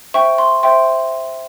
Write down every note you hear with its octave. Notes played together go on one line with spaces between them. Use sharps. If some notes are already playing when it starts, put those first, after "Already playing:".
C5 E5 G5 C#6
C6
C5 E5 G5 C6